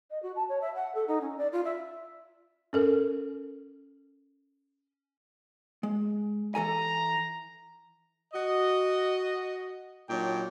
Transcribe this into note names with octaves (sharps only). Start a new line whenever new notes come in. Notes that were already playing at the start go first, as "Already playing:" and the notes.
D#5
F#4
A5
C#5
E5
F#5
A4
D#4
C#4
D5
F4
E5
C#4 A4 A#4
G#3
E3 A4 G#5 A#5
F#4 D#5
A#2 F#3 D4 D#4 C#5 G5